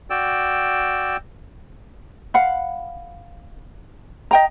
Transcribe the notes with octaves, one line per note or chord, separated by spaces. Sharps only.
F#4 D5 G5 E6
F5 F#5 B5
D#5 G5 A#5